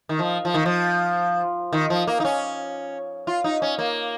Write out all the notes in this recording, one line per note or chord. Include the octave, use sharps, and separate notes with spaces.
D#3
F3
F3
D#3
F3
D#3
F3
A#3
D#4
C#4
F4
D#4
C#4
A#3